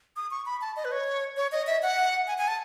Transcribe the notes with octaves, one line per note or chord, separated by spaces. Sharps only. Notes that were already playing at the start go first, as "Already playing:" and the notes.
D#6
C#6
B5
A5
D#5
B4
C#5
C#5
D#5
E5
F#5
G#5
G#5
A5